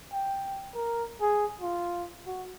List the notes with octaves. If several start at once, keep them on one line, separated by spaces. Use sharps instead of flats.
G5
A#4
G#4
F4
F#4